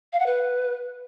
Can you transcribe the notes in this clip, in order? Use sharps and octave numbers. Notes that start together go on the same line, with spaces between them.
F5
F#5
B4